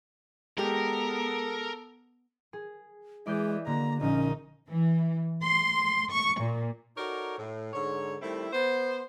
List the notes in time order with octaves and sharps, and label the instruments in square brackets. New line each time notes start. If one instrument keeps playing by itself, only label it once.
[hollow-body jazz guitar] G#3 G4 [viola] B3 [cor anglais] A4 [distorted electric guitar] A#4
[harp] G#4
[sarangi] E3 [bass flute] G#3 [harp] D5 D#5 G6
[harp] D3 F#4 [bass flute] A#3 [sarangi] A#5
[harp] A#1 F3 [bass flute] C#4 [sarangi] D#4
[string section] E3
C6
C#6
A#2
[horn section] D#4 F#4 A4 A#4 C#5 D5
A2
G#2 D3 C#5
D#3 G3 A3 C4 E4
B3 C5